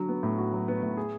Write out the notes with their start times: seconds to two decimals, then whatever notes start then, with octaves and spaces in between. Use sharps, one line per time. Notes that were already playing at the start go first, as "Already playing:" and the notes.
Already playing: D3 F#3 F#4
0.09 B3
0.23 A2
0.38 F#4
0.52 F#3
0.68 B3
0.83 A2
0.97 G#4